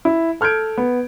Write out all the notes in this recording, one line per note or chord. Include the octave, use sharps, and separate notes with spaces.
E4
A4 F6 G6 G#6 D7
B3